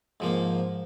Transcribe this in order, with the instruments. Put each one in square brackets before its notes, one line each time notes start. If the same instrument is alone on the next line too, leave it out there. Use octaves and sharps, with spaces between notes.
[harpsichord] G#2 F3 A#3